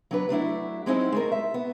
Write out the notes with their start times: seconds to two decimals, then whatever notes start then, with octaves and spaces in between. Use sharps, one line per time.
0.11 F#3 D4 B4
0.29 F#3 A3 D4 E4
0.86 F#3 G#3 C4 C#4 D#4 E4
1.12 G#3 A3 A#4
1.32 E5
1.54 B3